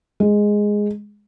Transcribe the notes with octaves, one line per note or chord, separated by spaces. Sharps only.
G#3